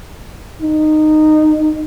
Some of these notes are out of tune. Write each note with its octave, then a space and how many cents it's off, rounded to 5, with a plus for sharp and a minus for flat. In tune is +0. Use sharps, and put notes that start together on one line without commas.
D#4 -15